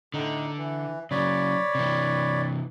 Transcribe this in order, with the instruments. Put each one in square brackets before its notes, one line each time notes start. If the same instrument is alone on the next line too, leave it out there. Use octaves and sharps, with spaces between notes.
[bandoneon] A2 D#4 [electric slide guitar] D3
[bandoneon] E3
[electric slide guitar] C#3 F#3 [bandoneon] C#5 D5 B5
[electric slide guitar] C3 E3